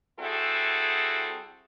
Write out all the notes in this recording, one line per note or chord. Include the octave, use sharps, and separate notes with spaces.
G3 C4 E4 F#4 G#4 A4